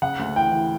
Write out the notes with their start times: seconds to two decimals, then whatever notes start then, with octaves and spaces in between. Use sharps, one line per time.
0.02 C#3 F#5
0.19 D2
0.36 E3 G5
0.52 E3